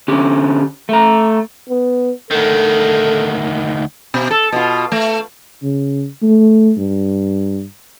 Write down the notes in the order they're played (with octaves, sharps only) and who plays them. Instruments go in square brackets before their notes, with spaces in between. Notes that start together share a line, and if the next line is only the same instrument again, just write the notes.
[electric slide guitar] D3 C#4 G4
A3 A#5
[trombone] B3
[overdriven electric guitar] D2 D#3 [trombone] A4
[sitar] B2
A4
B2 F4
A3
[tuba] C#3
A3
G2